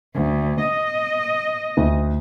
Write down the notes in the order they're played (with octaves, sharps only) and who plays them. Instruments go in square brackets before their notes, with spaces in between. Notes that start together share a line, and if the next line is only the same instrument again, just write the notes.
[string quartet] D2
D#5
[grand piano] D2